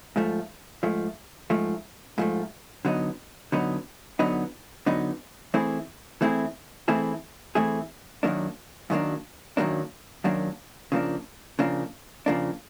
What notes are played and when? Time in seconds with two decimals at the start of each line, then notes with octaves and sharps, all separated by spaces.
0.16 G#2 F3 A3
0.83 G#2 F3 A3
1.50 G#2 F3 A3
2.18 G#2 F3 A3
2.85 D3 F#3 B3 D#4
3.52 D3 F#3 B3 D#4
4.19 D3 F#3 B3 D#4
4.86 D3 F#3 B3 D#4
5.54 E3 A3 C4 E4 G#4
6.21 E3 A3 C4 E4 G#4
6.88 E3 A3 C4 E4 G#4
7.55 E3 A3 C4 E4 G#4
8.23 F#2 D#3 F#3 A#3 D4
8.90 F#2 D#3 F#3 A#3 D4
9.57 F#2 D#3 F#3 A#3 D4
10.24 F#2 D#3 F#3 A#3 D4
10.92 C#3 F3 A#3 D4
11.59 C#3 F3 A#3 D4
12.26 C#3 F3 A#3 D4